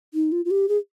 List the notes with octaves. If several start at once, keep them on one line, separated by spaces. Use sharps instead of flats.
D#4
F4
F4
G4
G#4